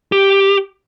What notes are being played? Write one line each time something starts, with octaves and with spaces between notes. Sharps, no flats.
G4